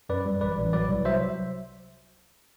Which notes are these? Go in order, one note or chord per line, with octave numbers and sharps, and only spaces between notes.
F#2 B4 D5
G3
A1 B4 D5
A1
F#3 B4 D5
C2
F#3 C5 E5